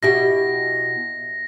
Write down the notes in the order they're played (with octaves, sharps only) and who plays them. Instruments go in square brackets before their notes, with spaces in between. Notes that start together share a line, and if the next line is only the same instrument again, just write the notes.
[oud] B2 E4 G4 [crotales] A#6